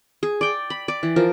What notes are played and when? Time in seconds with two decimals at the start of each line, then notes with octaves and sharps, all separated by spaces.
0.23 G#4
0.41 D5 G5
0.70 B5
0.88 D5
1.03 E3
1.16 F3 A#4